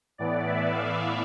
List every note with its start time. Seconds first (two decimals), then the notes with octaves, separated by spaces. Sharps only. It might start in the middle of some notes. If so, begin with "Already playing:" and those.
0.18 A2 E3 B3 D5
0.47 E5
0.75 F5